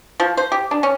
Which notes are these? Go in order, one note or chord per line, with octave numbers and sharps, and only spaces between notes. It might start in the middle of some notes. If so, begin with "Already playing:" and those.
F3
C5
G4
D4
C#4